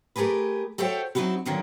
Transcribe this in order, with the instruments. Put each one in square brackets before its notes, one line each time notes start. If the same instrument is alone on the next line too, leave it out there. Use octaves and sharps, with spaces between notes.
[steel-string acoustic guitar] A3 G4 G#4 A#4 B4
F#4 A4 C5 C#5 E5 G5
F#3 C4 D#4 E4 F#4
E2 A#2 D3 D#3 F#3 E4